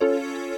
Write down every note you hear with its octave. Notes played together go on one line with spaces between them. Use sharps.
C#4 F4 A4 C#5